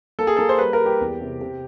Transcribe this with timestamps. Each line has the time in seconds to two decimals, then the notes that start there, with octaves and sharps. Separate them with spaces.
0.19 A#3 A4
0.27 G#4
0.37 A#3 A4
0.49 C5
0.59 G3 B4
0.73 A#4
0.80 G3
0.86 G4
1.01 E2
1.21 C3
1.41 C3